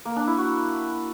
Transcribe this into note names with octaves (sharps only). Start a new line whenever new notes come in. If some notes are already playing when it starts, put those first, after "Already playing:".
A#3
D4
E4
F#4